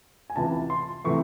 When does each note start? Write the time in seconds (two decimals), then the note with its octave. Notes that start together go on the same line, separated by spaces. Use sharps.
0.30 G#5
0.36 C#2 C3 E3 A5
0.70 C6
1.05 C3 E3 A3 C#6